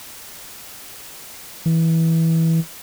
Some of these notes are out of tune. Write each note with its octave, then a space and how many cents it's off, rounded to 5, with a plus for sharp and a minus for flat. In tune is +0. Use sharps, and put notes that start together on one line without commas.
E3 -15